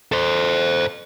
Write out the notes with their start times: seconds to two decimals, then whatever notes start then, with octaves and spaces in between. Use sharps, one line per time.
0.12 A4 C5